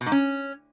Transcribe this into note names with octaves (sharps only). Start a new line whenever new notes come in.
B2
G#2
C#4